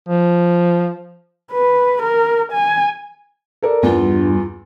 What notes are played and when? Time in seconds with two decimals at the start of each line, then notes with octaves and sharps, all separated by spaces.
0.08 F3
1.52 B4
2.03 A#4
2.53 G#5
3.62 A4 A#4 D5
3.83 E2 G2 F4